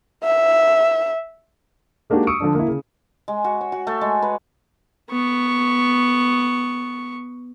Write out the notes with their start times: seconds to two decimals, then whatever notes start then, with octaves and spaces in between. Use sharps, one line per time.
0.24 E5
2.10 G#3 A#3 D4 D#4 F#4 G4
2.27 C#6 D#6 E6 C#7 D7
2.40 D3 F3 D4
2.55 A#3 E4
2.68 C#3
3.28 G#3
3.44 F#4
3.61 C#5
3.72 F#4
3.87 A3
4.01 G#3
4.22 B4
5.10 B3 C#6